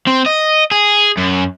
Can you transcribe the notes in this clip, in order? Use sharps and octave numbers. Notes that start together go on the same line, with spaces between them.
C4
D#5
G#4
F#2